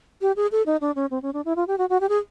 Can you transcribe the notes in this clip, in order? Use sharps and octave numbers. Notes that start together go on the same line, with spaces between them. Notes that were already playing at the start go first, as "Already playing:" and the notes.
G4
G#4
A4
D#4
D4
C#4
C4
C#4
D4
E4
F4
G4
F#4
F#4
G4
G#4